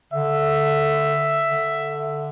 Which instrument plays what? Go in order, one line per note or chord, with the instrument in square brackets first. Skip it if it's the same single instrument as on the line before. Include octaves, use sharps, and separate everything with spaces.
[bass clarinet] D3 [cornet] E5
[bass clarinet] D3